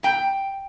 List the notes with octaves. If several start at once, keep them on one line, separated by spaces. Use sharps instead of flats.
A#2 G5